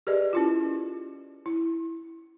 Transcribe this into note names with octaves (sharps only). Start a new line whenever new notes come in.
G4 G#4 A#4 B4 D5 D#5
C#4 E4 F4
E4